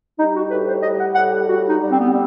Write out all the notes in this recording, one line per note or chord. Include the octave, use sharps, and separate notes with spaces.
G3 D#4
F#4
A2 B4
C5
G3 D#5
F#5
A2 F#5
G4
G3 F#4
D#4
G3
C4
B3
G3 C4